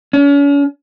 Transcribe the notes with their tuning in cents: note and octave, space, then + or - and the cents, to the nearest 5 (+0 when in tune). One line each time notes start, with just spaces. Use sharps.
C#4 +40